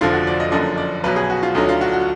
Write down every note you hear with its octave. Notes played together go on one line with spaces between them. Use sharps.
F1 F2 D3 F3 F4
F#4
D5
D#5
F#1 F#2 D3 F3 D#5
D5
B1 B2 F#3 B4
G#4
F#4
F4
D2 D3 F#3 D#4
F4
F#4
F#4